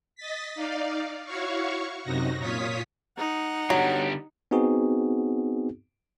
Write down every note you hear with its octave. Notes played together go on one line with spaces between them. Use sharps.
D#5 A6 B6
D#4 D5 F5
E4 F#4 C#5 F5 C#6
F#2 C3 D#4 F#4 A#6
A#2 F4 C#5 D#6 B6
D#4 F#5
D3 F#3 G3
B3 C4 D#4 F#4 G#4